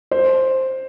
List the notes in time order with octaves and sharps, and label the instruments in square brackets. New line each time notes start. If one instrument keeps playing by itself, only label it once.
[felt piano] C5